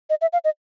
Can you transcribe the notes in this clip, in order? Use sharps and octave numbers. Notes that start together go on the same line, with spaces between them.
D#5
E5
F5
D#5